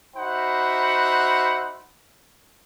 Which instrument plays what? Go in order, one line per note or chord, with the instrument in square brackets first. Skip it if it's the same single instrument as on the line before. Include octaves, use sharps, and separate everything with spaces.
[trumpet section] D#4 F#4 C5 E5 F#5 B5